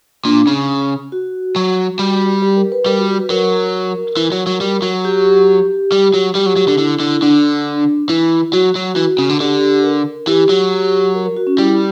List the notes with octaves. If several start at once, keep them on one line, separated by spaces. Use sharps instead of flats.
A#2 D4
C#3
F#4
F#3
G3
G4
A#4
B4
G3 A#4
F#4
F#4
B4
F#3 A#4
E3
F#3
F#3
G3
F#3
G4
G3
F#3
G3 G4
F#3
F#3
D3
D3 E4
D3
D3 D4
E3 E4
F#3 F#4
F#3
E3
C#3
D3
D3 G4
A#4
E3 G4
F#3
A#4
A#4
F#4
C#4
G3 E4